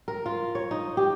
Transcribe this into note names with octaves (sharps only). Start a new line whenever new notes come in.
A#4
F4
C#5
D#4
G4